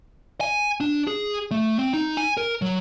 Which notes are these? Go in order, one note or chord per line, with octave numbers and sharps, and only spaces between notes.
G#5
D4
G#4
A3
C4
D#4
G#5
A#4
F#3